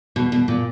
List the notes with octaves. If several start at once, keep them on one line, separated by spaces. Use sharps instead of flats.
B2
B2
A#2